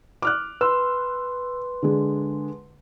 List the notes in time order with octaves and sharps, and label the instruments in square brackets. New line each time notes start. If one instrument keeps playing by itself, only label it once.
[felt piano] D6 F6 F#6
[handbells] B4 C6 [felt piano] E6
[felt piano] D3 G#3